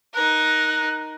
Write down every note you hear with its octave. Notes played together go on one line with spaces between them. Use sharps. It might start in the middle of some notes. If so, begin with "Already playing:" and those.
D#4 A#4 F#6